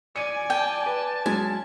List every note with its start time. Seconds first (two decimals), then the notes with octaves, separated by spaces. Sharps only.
0.16 D5 G#5 C#7 D#7
0.50 G5 A5 G6
0.86 B4
1.26 F#3 G#3 C#4 G#5